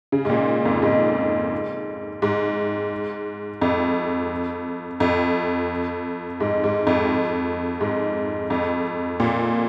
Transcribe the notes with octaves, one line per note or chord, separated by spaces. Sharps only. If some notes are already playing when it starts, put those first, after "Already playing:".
C#3
G#2
A#2
F2
G#2
G#2
F2
F2
G#2
G#2
F2
G#2
F2
A#2